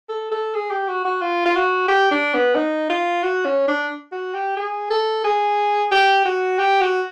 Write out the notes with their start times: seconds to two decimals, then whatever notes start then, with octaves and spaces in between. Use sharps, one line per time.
0.09 A4
0.32 A4
0.54 G#4
0.71 G4
0.89 F#4
1.05 F#4
1.21 F4
1.46 F4
1.56 F#4
1.88 G4
2.11 D4
2.34 B3
2.55 D#4
2.89 F4
3.23 F#4
3.45 C#4
3.68 D4
4.13 F#4
4.34 G4
4.57 G#4
4.91 A4
5.24 G#4
5.92 G4
6.25 F#4
6.59 G4
6.81 F#4